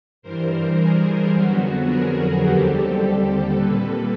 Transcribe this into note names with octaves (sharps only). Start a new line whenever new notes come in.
G2 E3 G3 A#4 C5
G#4 A#4
F2 D3 F#3 B3 F#4
G#4 A#4
D#2 D3 G3 C4 G4 A4
A#2 G3 A#3 A4 B4